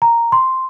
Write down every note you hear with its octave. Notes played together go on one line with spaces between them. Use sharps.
A#5
C6